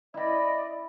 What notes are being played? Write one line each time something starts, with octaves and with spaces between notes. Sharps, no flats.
E4 D5 D#5 B5